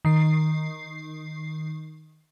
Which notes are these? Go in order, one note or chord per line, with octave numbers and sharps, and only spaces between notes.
D#3 C7